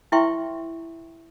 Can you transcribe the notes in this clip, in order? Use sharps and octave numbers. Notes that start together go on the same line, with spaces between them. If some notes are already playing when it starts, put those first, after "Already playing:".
E4 B4 E5 G5 C6 C#6